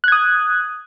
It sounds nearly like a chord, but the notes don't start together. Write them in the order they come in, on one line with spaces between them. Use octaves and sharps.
F#6 G#6 D#6